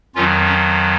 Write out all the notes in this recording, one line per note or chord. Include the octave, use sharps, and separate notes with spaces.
F2 D#3 F#3 C#4 F4
C#4